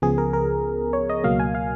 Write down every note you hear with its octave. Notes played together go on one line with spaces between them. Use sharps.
C#2 C#3 F3 B3 G#4
A#4
A#4
C#5
D#5
C#2 B2 F#3 A#3 F5
G#5
F5